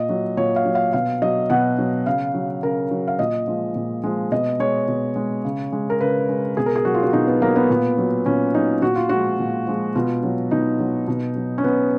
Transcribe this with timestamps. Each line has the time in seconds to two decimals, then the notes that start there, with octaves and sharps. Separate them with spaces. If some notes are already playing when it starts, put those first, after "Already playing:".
Already playing: A#2 D#5
0.09 F#3
0.37 A#2 C#5
0.56 F5
0.65 F#3
0.75 F5
0.93 B2 F5
1.22 F#3 D#5
1.50 B2 F#5
1.79 F#3
2.06 C#3 F5
2.34 F#3
2.63 C#3 A#4
2.91 F#3
3.08 F5
3.19 A#2 D#5
3.47 F3 G#3
3.76 A#2
4.04 F3 G#3
4.32 B2 D#5
4.60 G#3 C#5
4.88 B2
5.16 G#3
5.45 C#3
5.72 G#3
5.90 A#4
6.01 C#3 B4
6.29 G#3
6.57 B2 G#4
6.66 A#4
6.76 G#4
6.85 F#3 F#4
6.94 F4
7.03 F#4
7.13 B2 D#4
7.27 B3
7.42 F#3 A#3
7.56 B3
7.70 A#2
7.98 F#3
8.26 A#2 C#4
8.55 F#3 D#4
8.82 A#2 F#4
8.96 F4
9.09 F3 G#3 F#4
9.39 A#2
9.67 F3 G#3
9.95 B2 F4
10.23 F#3
10.51 B2 D#4
10.79 F#3
11.08 B2
11.36 F#3
11.58 C#4
11.64 B2 B3